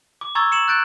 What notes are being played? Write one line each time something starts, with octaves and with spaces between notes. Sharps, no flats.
D6
A#5 C#6 E6 G#6 A6
C#7 E7 F#7
F#6 G6 A6 D7